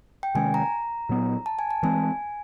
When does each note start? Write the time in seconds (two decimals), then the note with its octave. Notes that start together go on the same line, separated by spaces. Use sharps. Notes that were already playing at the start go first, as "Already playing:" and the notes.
0.23 G5
0.35 C3 D#3 G#3 C#4 G#5
0.54 A#5
1.09 A#2 F#3 B3
1.46 A5
1.59 G#5
1.71 A5
1.83 E3 G#3 C4 G#5